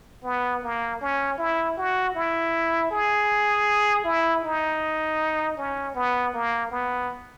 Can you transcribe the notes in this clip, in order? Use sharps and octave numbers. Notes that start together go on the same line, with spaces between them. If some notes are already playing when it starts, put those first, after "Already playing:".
B3
A#3
C#4
E4
F#4
E4
G#4
E4
D#4
C#4
B3
A#3
B3